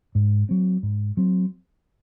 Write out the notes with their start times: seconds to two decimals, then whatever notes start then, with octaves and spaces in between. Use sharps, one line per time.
0.15 G#2
0.49 F#3 C4
0.83 G#2
1.17 F#3 C4